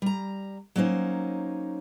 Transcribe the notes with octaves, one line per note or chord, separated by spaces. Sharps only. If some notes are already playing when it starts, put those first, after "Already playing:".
G3 A#5
F#3 A#3 C#4 D#4 C5